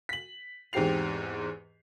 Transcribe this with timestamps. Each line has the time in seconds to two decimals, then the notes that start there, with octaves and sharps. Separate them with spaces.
0.09 B6 F#7
0.73 E2 G#2 C4 G4 C7 F7